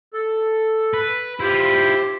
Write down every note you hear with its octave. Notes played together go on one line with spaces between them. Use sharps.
A4
B4
E4 F4 G4 C5